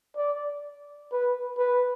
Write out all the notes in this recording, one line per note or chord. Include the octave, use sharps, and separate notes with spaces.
D5
B4
B4